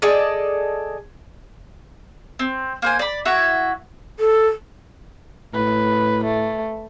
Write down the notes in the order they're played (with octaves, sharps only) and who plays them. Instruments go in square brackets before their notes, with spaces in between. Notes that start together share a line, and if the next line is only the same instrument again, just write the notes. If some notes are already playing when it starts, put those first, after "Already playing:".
[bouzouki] G#4 A4 D5 D#5
[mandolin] C4
A#3 C5 G#5
D5 B5
E4 F#4 E5 F#5
[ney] A4
[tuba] A2 [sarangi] B4
[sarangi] A3